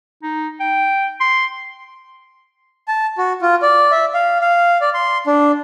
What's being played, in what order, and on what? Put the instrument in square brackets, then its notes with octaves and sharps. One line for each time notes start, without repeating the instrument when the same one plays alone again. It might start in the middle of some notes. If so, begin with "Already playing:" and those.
[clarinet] D#4
G5
C6
[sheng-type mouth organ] A5
F#4
F4
D5
E5
F5
F5
D5
C6
D4